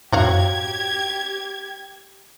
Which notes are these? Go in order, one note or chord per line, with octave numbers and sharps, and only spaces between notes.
F#2 A2 F#3 F#4 G4 F5 G#6